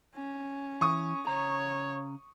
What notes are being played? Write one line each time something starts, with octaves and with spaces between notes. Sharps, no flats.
C#4
E3 C#6 D#6
C#3 C#5 A#5